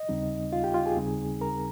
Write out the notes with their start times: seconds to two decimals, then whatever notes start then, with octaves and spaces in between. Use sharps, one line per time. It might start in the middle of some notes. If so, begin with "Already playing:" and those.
Already playing: D#5
0.09 D#2 C#3 G3 C4 D#4
0.53 F4 F5
0.64 G4 G5
0.74 F4 F5
0.86 G#4 G#5
0.97 D#2 C#3 G3 C4 D#4
1.41 A#4 A#5